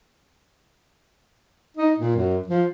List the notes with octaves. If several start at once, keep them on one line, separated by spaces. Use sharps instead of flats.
D#4
A#2
F#2
F3